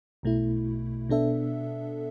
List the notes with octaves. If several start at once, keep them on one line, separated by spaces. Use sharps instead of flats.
B1 B2 A3 E4
B2 B3 D4 A4 E5